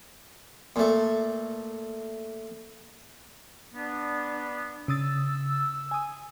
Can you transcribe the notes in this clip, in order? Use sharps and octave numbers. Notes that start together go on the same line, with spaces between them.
A#2 A3
B3 D4
C#3 D#6 E6 A6
G#5 D#6